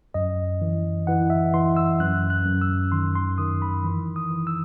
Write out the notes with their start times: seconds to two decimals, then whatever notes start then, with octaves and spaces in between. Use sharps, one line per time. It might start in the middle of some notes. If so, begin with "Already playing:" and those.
0.14 F#2 D#5
0.61 E3
1.07 E3 F#5
1.30 E5
1.54 E3 C6
1.77 E6
2.00 F#2 F#6
2.30 F#6
2.46 F#2
2.61 E6
2.92 D#3 C6
3.15 C6
3.38 D#3 D#6
3.62 B5
3.85 E3
4.16 D#6
4.31 E3
4.47 E6